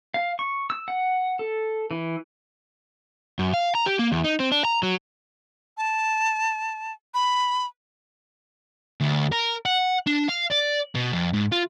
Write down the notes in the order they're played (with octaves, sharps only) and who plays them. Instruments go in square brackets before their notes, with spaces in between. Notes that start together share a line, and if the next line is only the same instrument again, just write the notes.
[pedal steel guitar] F5
C#6
E6
F#5
A4
E3
[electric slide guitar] F#2
F5
A#5
G4
A#3
E2
D#4
C4
D4
A#5
F#3
[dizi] A5
B5
[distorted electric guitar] D2
A#4
F#5
D4
F5
D5
B2
F2
G#2
F4